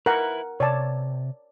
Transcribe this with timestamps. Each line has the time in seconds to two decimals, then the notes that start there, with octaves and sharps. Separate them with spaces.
0.06 E4 A#4 B4 F#5
0.60 C3 C#5 D5 A5